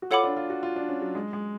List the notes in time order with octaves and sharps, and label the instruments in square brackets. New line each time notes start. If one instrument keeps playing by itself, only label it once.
[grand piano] F#4
[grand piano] F4 [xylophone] A4 C#5 F#5 B5 D6
[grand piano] D4
F4
F#4
F4
D4
C#4
F#3
G#3
G#3